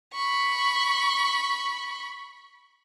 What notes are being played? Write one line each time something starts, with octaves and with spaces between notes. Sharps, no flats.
B5 C#6